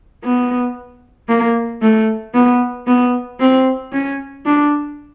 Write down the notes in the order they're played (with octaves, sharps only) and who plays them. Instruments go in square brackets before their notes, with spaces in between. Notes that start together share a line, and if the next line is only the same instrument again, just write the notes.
[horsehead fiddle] B3
A#3
A3
B3
B3
C4
C#4
D4